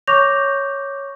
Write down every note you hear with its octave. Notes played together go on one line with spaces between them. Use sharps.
C#5 C#6 D6 G6 A#6 F7